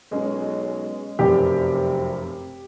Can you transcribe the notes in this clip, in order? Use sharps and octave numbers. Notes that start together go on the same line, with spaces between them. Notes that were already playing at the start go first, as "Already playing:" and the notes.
B1 G#3 C#4
F1 F#2 C3 G4 D5